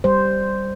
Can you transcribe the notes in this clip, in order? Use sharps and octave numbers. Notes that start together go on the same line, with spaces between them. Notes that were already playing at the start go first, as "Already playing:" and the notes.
G3 C5